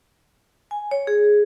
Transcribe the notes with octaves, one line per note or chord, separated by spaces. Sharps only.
G#5
C#5
G#4